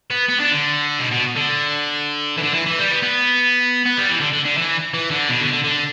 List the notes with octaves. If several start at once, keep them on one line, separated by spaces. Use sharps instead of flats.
B3
B3
D4
D3
B2
B2
D3
E3
D3
E3
E3
G3
B3
B3
B3
G3
E3
D3
D3
D3
E3
E3
D3
B2
D3
D3
D3